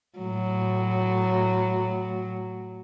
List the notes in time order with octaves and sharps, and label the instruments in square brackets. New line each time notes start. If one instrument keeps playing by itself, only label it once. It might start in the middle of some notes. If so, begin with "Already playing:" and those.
[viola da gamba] A2 F#3